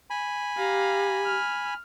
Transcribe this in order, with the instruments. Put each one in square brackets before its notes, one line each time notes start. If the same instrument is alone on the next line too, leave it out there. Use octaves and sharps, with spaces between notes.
[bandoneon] G#5 B5
[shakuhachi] G4 [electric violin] F5 A#5
[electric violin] F6